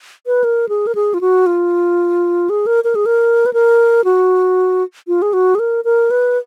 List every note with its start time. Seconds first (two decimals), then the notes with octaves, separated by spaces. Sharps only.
0.26 B4
0.44 A#4
0.69 G#4
0.87 A#4
0.95 G#4
1.14 F4
1.21 F#4
1.46 F4
2.49 G#4
2.66 A#4
2.84 A#4
2.95 G#4
3.06 A#4
3.46 B4
3.53 A#4
4.04 F#4
5.08 F4
5.22 G#4
5.33 F#4
5.55 G#4
5.59 A#4
5.84 A#4
6.11 B4